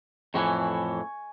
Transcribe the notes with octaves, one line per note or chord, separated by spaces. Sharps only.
F2 A2 E3 G#5 C#6